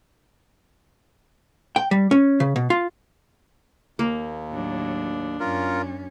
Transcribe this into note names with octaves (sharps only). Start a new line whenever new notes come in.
G5
G3
C#4
C#3
B2
F4
D#2 A#3
A2 F#3 D4
F#2 C#4 F4 A#4